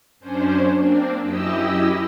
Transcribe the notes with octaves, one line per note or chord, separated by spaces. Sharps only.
F#2 C#4 D4 C5
A#3 C4 D4
F#2 E4 G4 D#5 E6